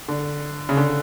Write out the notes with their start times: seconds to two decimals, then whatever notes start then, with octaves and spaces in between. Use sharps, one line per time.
0.08 D3
0.69 C#3
0.77 D3